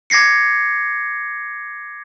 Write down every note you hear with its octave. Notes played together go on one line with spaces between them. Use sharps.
D6 G#6 A#6 C7 C#7